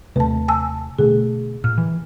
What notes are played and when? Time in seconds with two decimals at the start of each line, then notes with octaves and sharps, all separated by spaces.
0.16 D#2 C3 A3 B4 A5
0.48 G#5 A5 E6
0.99 B2 D3 A3 G#4
1.64 A#2 F6
1.78 E3